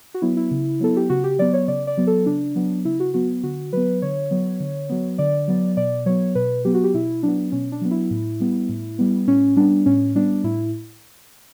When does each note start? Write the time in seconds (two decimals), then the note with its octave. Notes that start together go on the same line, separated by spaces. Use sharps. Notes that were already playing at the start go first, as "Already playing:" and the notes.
0.14 F#4
0.22 F#3 B3 E4
0.37 E4
0.51 C#3
0.80 F#3 B3 A4
0.97 G4
1.09 C#3 F#4
1.24 G4
1.39 F#3 B3 D5
1.53 C#5
1.68 C#3 D5
1.87 D5
1.97 F#3 B3
2.07 A4
2.26 C#3 D4
2.56 F#3 B3
2.85 C#3 E4
3.00 F#4
3.14 F#3 B3 F#4
3.43 D3 F#4
3.73 F#3 B3 B4
4.02 D3 C#5
4.31 F#3 B3
4.60 D3
4.89 F#3 B3
5.18 D3 D5
5.48 F#3 B3
5.77 B2 D5
6.06 F#3 B3 C#5
6.35 B2 B4
6.65 F#3 B3 G4
6.74 F#4
6.84 G4
6.94 B2 E4
7.23 F#3 B3 D4
7.52 B2 C#4
7.72 D4
7.81 F#3 B3
7.91 E4
8.11 A2
8.40 G3 B3
8.69 A2
8.99 G3 B3
9.27 A2 C#4
9.56 G3 B3 D4
9.86 A2 C#4
10.15 G3 B3 D4
10.44 A2 E4